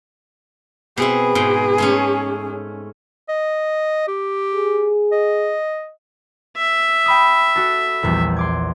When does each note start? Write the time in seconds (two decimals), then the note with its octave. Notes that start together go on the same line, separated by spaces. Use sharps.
0.97 B2 C4 E4 G#4
1.35 G#2 B2 G5
1.78 G#2 A3 C#4
3.28 D#5
4.08 G4
4.54 G#4
5.12 D#5
6.57 E5
7.06 G5 B5 D#6
7.56 F#4 A4
8.03 A#1 E2 G3
8.37 C6 D6 G#6